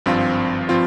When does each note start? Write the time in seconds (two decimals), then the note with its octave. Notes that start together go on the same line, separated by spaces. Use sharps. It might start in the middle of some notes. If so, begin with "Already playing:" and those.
0.06 G#1 G2 F3 C4 F4
0.69 F3 C4 F4